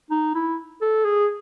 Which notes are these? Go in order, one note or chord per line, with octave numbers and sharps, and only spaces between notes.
D#4
E4
A4
G#4